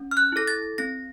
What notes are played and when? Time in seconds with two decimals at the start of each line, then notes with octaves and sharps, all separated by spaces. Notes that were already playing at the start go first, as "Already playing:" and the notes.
Already playing: C#4
0.11 F6
0.17 F#6
0.32 E4 A4 A#6
0.48 A6
0.78 C4 A#6